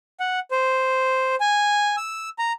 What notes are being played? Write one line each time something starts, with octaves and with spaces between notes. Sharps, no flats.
F#5
C5
G#5
E6
A#5